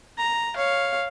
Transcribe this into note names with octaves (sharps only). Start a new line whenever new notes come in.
A#5
C#5 F5